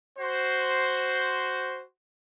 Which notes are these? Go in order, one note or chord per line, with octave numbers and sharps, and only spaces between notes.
F#4 C5